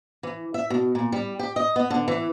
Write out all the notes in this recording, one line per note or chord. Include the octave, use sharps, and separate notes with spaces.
E3
E5
B2
A#2
G3
G4
D#5
B3
D3
E3